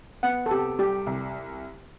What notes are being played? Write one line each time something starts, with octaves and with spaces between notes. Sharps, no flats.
B3 F#5
A4
C3 G4
G3 G4
C2